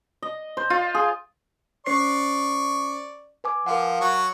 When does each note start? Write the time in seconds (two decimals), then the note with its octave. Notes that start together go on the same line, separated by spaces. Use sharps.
0.22 D#5
0.57 C5
0.70 F4
0.95 G#4
1.86 C#4 C5 D5 C#6 C7
3.44 B4 G#5 D6
3.66 F3 A#4 F5 F#5
4.01 F#3 C#6